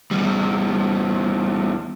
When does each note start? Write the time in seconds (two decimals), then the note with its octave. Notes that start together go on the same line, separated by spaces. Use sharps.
0.11 E2 G3